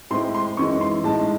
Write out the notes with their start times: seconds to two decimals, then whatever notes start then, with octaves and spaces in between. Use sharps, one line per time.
0.10 A2 G#3 C4 E4 C6
0.35 C6
0.57 F#2 E3 G#3 D#4 C#6
0.81 C6
1.04 A2 G#3 D#4 A5